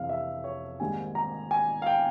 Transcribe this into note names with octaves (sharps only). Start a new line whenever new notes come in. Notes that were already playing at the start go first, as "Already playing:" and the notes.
Already playing: F1 F2 E3 F5
E5
C#5
G#1 G#2 G3 A#3 G#5
A#5
G#5
F5
G5